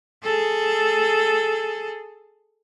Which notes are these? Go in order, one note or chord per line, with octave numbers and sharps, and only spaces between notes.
G#4 A4